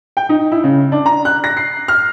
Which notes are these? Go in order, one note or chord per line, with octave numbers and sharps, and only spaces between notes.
G5
D#4
E4
C#3
D4
A#5
F#6
A#6
C7
F6